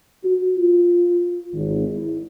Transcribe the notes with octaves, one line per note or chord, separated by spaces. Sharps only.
F#4
F4
G#1
E4